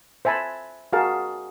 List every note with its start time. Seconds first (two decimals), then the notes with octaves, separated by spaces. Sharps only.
0.25 C5 E5 G#5 A5 B5
0.93 F#4 G#4 A#4 F5 A5